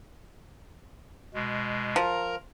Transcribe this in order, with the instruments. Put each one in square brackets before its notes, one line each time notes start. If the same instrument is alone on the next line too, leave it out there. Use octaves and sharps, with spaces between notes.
[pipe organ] B2 G#3
[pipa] F3 [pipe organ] A#4 A#5